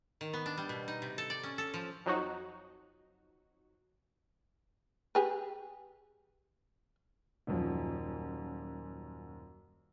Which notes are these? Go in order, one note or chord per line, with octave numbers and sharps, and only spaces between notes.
D#3
B3
D4
G3
B2
D#4
C3
A4
D5
C#4
A4
F3
F2 F#3 D#4 F#4
G4 G#4 B4
D#1 F#2 F3